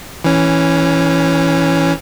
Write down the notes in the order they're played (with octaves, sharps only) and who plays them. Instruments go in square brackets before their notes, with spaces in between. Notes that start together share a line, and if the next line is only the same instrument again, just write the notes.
[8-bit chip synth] E3 C#4